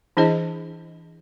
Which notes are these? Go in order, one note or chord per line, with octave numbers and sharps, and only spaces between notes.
E3 D4 E4 G#4 C5 D#5